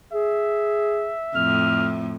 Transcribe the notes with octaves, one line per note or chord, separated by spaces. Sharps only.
G#4 E5
F2 A2 F6